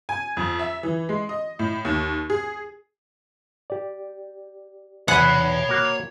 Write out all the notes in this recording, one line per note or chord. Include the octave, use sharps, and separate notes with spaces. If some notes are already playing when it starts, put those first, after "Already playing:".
G#5
F2
E5
E3
G#3
D#5
A2
D#2
G#4
G4 D5
E2 C#5 F#5 G#5 B5
A#3 F#4